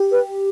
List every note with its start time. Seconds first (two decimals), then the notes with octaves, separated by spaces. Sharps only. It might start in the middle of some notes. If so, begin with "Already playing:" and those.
Already playing: G4
0.12 B4